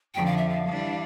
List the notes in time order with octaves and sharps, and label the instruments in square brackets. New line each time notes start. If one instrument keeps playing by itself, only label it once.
[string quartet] F2 D3 F3 [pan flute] G5
[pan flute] F5
E5
F5
[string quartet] E3 G3 D4